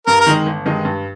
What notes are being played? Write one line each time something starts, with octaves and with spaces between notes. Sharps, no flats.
G2 A#4
A#4
D#3 G#3 D#4
G1
G2 D#3 G#3 D#4
G2